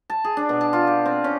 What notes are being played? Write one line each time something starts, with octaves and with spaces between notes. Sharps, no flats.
A5
G#4
D4
B2
A5
F4
G4
C4
C#4